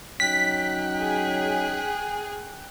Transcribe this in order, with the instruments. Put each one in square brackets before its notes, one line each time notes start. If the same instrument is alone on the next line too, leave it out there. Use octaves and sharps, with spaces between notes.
[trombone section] F#3 C#4 D#4 [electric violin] G5 F#6 [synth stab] B6
[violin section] G#4